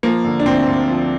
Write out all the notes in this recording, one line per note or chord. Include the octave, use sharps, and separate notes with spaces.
F3 A#3
D3
D4
D2 C4
D2
F3